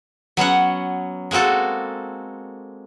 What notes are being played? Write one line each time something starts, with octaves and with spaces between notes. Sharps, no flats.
F#3 B3 C#4 F#5
G#3 A#3 C4 F#4 A4